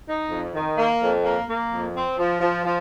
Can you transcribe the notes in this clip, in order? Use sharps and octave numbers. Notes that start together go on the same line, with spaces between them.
D#4
F2
D#3
A#3
F2
A#3
A#3
F2
C4
F3
F3
F3